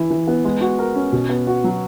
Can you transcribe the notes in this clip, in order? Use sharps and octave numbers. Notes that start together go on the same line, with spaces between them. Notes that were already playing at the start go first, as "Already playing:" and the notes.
Already playing: E3 E4
E3
B3
G#3
F#4
A#4
C#4
B2
B3
F#4
F#3